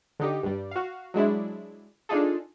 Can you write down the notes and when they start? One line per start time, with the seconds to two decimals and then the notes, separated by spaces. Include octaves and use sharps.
0.19 D3 D#4 G4
0.43 G2 G3
0.71 F#4 F5
1.14 F#3 G#3 D4 E4
2.09 D4 D#4 F4 G#4 A4